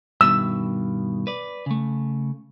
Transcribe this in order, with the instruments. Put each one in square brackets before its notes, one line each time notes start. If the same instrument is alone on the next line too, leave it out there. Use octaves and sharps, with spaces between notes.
[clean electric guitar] G2 B2 D#3 [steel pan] E6
[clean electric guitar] B4 D5
C#3 A3